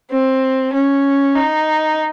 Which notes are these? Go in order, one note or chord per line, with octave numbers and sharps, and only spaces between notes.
C4
C#4
D#4